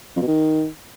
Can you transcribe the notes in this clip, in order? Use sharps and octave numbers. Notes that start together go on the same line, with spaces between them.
F2
B2
D#3